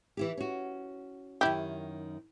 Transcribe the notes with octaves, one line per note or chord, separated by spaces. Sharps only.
E3 E4 G4
C#4 F#4
F#2 D#3 E4 G4